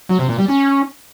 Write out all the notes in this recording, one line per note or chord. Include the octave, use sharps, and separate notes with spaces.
F#3
C3
A#2
G3
C#4